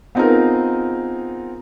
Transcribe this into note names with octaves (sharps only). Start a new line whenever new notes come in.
B3 C4 D#4 F4 G#4 A#4